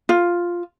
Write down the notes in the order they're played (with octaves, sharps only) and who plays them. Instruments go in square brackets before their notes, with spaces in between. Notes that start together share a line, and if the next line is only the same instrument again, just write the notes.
[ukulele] F4